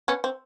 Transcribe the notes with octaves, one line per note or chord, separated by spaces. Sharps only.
B3 C#4
C4